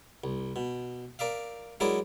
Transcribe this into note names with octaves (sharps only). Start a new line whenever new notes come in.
C2
B2
A#4 D5 E5 F5
F#3 G#3 E4 A#4 C#5 D5